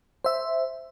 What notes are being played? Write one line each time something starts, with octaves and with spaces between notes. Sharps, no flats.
C5 E5